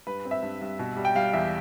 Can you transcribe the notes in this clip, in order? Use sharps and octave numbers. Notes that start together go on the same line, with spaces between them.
G2 B4
C4
E5
G2
G2
B2
G3
G5
G3 F5
E2 E5